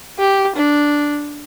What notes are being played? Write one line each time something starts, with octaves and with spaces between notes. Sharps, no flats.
G4
D4